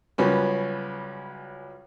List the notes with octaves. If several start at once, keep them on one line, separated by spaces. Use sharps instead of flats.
C#2 F#3 G3 B3 C#4